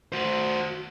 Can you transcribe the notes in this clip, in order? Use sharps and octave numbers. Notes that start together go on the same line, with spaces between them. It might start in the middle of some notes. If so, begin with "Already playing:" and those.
F#4 C5